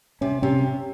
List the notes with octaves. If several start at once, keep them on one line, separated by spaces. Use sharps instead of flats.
C3 C#4
C3 C#4